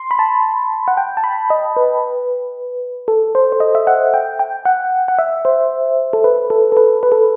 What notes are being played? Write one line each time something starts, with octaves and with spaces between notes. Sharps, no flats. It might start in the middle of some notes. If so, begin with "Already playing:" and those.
Already playing: C6
B5
A5
F#5
G5
A5
B5
D#5
B4
A4
C5
C5
D#5
E5
F#5
G5
G5
F#5
F#5
E5
C5
A4
B4
A4
A4
B4
B4
A4